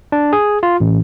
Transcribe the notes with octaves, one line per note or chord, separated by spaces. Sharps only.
D4
G#4
F4
A1